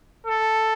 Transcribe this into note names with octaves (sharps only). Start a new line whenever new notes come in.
A4